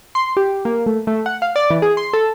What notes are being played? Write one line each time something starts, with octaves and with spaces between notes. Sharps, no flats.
C6
G4
A#3
A3
A3
F#5
F5
D5
E3
G#4
C6
A4